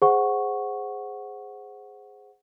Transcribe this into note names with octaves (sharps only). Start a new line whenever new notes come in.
G#4 C5 F#5 C#6